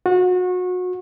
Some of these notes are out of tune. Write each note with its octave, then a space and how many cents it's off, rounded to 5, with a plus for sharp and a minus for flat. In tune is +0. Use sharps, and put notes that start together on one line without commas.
F#4 -30